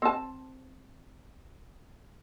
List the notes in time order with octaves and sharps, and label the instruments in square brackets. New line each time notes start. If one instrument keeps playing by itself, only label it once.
[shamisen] C4 A5